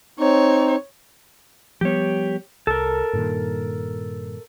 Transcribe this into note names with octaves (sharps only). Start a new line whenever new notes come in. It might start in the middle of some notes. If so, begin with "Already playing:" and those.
C4 D#4 C#5
F3 G3 B3 G4 C#5
C2 A4 A#4
G2 A#2 D#3